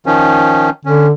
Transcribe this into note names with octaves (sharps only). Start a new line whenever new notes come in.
D#3 F3 C#4
D3 C#4